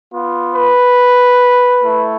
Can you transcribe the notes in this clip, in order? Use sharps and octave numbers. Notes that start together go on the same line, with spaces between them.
B3 F4
B4
A3 E4